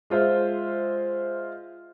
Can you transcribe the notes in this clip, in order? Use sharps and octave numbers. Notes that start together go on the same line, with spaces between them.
G#3 F4 C5 E5